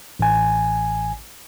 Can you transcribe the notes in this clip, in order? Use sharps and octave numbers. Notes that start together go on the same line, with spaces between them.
A1 G#5